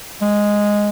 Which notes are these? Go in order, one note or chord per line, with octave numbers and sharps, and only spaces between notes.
G#3